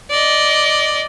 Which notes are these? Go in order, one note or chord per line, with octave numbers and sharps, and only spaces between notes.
D5 D#5